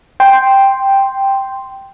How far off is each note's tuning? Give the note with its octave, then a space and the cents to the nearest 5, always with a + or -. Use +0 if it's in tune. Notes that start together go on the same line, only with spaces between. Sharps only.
G5 +0 C6 +0